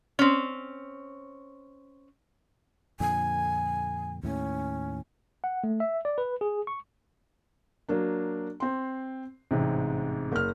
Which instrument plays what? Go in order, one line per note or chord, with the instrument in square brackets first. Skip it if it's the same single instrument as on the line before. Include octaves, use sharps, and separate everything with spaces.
[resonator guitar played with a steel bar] C4 C#4
[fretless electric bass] F2 A#2 D3 [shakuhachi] G#5
[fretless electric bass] D#2 A2 [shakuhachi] C#4
[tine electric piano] F#5
A3
E5
D5
B4
G#4
C#6
[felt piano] F#3 A#3 D4
C4 C6
A1 G#2 C3
F#1 F6